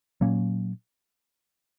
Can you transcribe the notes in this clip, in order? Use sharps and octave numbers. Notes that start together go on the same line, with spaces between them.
A#2 F#3 A#3 C#4